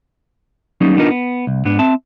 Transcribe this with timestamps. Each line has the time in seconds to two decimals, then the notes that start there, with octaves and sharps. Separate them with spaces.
0.81 F#3 G3 A#3 C#4 D#4
0.97 B3 D4 D#4 F4 A#4
1.10 B3
1.47 C2
1.65 G#2 B3 D4
1.79 C4 E5 A5